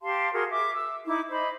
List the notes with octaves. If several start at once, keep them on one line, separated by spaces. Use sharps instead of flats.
G4 F5 A5 C6
F#4 G#4 A#4 C6
E5 D6
E6
D#4 E4 D6
C5 D#5 B5